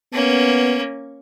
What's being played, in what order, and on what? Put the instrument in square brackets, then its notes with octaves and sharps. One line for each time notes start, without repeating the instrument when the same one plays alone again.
[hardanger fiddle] A#3 C#4 [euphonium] B3